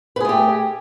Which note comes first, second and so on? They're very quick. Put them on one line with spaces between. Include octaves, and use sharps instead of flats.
B4 G#4 A3 G4